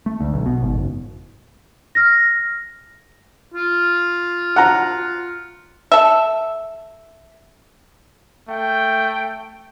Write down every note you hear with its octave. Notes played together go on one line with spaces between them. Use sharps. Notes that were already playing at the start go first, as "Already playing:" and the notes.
A3
D2
B1
B2
G#1
F#1
F6 A#6
F4
F#5 A#5
A4 E5
A3 G5